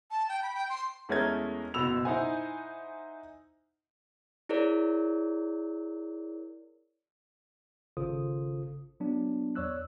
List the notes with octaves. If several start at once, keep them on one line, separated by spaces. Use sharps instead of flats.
A5
G5
B5
G5
C6
E2 G#3 A3 C#4 A#4 G#6
F#1 B2 B5 E6 F7
D#4 E4 C5 F#5 G#5
E4 G#4 A#4 C#5 D5
G#1 C#3 F4 A4 C5 D#6
F#3 B3 D4
E2 C#5 D5 E6 F#6